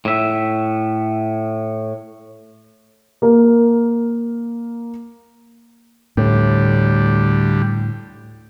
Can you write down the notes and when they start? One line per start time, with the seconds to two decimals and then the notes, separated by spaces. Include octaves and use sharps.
0.05 A2 E5
3.22 A#3 A#4
6.17 D2 A2 G3